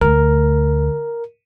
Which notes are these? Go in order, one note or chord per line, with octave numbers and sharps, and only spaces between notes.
D2 A3 A#4